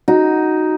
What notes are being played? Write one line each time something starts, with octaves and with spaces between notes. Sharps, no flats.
D#4 F#4